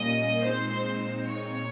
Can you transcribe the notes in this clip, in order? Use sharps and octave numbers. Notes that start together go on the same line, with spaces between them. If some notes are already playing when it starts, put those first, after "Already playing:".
Already playing: A#2 G3 A#3 C#4 D#5
A#2 G#3 C4 D#4 C5
C5
C5
C#5
A#2